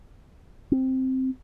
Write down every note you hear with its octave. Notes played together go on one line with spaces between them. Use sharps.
C4